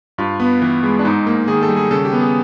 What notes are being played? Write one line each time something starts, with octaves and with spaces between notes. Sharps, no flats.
G2 F4
B3
E3
G#3
D4
G#2 D#4
A#3
D#3 G#4
A4
G3
G#4
C#3 A4
G4
B3
G#4